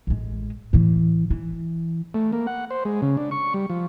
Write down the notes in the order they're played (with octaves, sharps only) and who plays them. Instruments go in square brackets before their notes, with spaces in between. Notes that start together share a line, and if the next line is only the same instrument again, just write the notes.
[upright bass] A1 G#3
A2 E3
E3
[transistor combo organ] A3
A#3
F#5
C5
G#3
C#3
D4
C#6
G3
F3